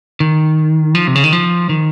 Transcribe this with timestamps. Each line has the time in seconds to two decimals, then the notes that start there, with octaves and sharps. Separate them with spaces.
0.20 D#3
0.95 F3
1.07 C3
1.15 C#3
1.24 D#3
1.32 F3
1.69 D#3